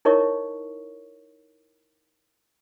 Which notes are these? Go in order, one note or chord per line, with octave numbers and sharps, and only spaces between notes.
D#4 E4 A#4 C#5 D#5 C#6